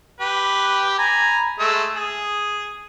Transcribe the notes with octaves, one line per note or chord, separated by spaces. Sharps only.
G4 B4
G#5 A#5 B5
G#3 A3 E6
G#4